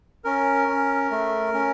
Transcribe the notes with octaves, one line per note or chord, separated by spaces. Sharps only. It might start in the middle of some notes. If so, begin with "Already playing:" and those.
C#4 A#4
C#4
A3
C#4